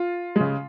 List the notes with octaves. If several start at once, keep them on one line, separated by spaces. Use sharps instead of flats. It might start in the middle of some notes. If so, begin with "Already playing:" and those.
Already playing: F4
C#3 G#3